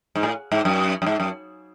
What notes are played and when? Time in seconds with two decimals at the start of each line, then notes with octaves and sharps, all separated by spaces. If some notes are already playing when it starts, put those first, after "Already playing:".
0.15 G#2
0.23 A2
0.52 G#2
0.65 F#2
1.02 F#2
1.06 G#2
1.20 F#2